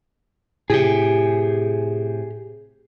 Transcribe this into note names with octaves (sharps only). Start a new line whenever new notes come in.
A2 C3 G4 G#4